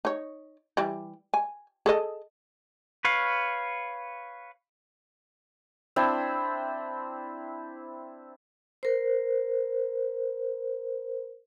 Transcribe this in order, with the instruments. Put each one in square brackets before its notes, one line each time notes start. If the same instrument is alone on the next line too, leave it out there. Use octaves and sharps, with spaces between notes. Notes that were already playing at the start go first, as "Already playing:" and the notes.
[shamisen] D#4 C#5
E3 G3
G#5
G#4 A4 D#5
[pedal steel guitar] B4 C#5 F5
[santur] C4 D4 E4 C5
[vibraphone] A#4 C5